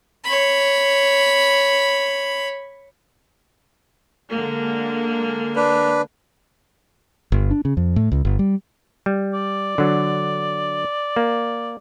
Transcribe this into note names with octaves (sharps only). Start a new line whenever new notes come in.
C#5 B5
D3 G#3 A#3
D4 B4
G1
D4
C#3
F2
A2
C#2
G1
G3
G3
D5
D3 F#3
A#3